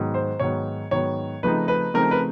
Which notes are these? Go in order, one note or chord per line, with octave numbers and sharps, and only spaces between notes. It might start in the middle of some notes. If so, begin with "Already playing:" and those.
Already playing: G#2 D#3 F#3 B3
C5
G#2 D#3 F#3 B3 C#5
G#2 D#3 F#3 B3 C#5
C#3 F3 A3 C4 D#4 B4
B4
C#3 F3 A3 C4 D#4 A#4
B4